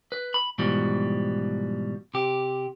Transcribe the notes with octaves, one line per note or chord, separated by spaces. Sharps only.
B4
B5
G#2 B2 E3 F3 G3
C3 G4